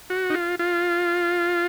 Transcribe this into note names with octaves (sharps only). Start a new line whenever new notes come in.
F#4
D#4
F4
F4